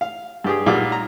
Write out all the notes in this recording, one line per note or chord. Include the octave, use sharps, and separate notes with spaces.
F5
G2 G4 G#4
B1 A#2 G3 F5 D6
A#5